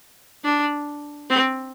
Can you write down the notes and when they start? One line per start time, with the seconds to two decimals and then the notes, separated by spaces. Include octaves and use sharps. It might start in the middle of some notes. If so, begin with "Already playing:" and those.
0.44 D4
1.30 C4